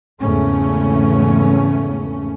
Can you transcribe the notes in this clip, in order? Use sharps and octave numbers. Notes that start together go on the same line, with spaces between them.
G#1 E2 C#3 A3 C#4